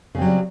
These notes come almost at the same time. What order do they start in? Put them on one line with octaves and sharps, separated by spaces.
C#3 C4 F#3 G3